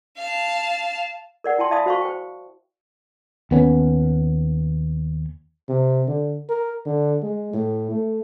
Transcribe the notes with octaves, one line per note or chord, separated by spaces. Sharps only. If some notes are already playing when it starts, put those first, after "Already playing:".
F5 A5
A#4 D5 F#5
E4 G5 A5 C6
D5 E5 F5 A5 B5 D#6
F#4 C5 F5 A5 C#6
C5 G5
D#2 B3 C#4
C3
D3
A#4
D3
G#3
A2
A3